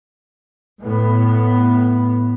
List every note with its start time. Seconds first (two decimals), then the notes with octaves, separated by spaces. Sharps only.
0.81 A2 B3